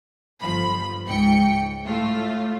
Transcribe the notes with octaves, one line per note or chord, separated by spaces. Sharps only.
G1 F3 B5
C#2 G#2 G5 C#7
A2 A3 F4